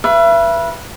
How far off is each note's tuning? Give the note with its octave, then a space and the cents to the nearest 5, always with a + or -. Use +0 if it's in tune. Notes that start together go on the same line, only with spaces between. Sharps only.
B4 -20 E5 +35